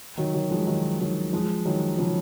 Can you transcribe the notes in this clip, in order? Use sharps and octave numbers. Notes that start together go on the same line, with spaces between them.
D#3 F#3
D#3 F#3
F3 G#3
D#3 F#3
D#3 F#3
F3 G#3
D#3 F#3
C#3 F3